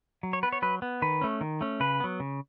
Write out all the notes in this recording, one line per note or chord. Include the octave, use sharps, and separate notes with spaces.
F#3
C#5
B3 B4
C#5
F#3 B4
B3
D#3 B4
A3 C#4
D#3
A3 C#4
C#3 B4
F#3 B3
C#3